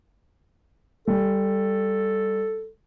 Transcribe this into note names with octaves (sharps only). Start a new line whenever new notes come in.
G3 A4